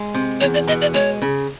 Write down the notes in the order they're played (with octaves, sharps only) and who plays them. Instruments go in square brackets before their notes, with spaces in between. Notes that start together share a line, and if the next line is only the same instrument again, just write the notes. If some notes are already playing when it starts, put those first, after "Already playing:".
Already playing: [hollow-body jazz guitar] G#3
C3
[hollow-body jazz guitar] E2 [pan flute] C#5
[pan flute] D5
[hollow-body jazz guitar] B2 [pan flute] D#5
[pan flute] D5
[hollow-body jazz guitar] G#3 [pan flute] C#5
[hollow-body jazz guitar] C#3